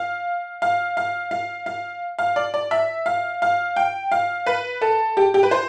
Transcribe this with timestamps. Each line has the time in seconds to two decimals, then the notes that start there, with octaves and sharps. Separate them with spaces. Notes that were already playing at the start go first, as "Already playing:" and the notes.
Already playing: F5
0.62 F5
0.97 F5
1.31 F5
1.66 F5
2.19 F5
2.36 D5
2.54 D5
2.71 E5
3.06 F5
3.42 F5
3.76 G5
4.12 F5
4.46 B4
4.82 A4
5.17 G4
5.34 G4
5.43 B4
5.51 C5